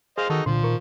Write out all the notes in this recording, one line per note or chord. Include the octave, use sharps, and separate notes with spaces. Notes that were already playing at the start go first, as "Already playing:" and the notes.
G#4 C5 D#5 F5
D#3 D#4 F#4 A4
C2 A#2 D3 F3 C6
D#3 A#4 C#6